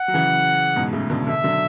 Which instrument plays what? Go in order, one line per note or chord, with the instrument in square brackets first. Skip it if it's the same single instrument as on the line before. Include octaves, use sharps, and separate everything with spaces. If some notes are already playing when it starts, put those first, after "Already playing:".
Already playing: [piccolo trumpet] F#5
[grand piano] F#3
C#3 E3
G#2 B2
A2 C#3
B2 D3
[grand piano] B2 D3 [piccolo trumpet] E5
[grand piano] D3 F#3